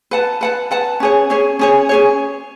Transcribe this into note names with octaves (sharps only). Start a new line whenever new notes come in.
B4 F#5 A5
B4 F#5 A5
B4 F#5 A5
C#4 G#4 C#5
C#4 G#4 C#5
C#4 G#4 C#5
C#4 G#4 C#5